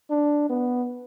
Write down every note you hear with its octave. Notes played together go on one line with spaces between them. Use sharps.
D4
B3